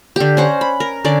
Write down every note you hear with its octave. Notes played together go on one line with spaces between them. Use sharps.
D3 G4
C#4 C5 F#5 A#5
B5
A#4
D3 C#4 D5